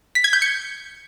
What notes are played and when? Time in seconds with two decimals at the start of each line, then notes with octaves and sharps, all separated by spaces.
0.15 B6
0.24 G#6
0.33 G6
0.42 C#7